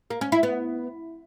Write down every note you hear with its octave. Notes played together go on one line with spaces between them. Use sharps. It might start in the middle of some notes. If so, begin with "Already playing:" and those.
A#3
C#4
E4
B3